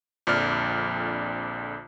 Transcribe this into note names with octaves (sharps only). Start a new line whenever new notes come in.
A#1 F2 D3 D5 F6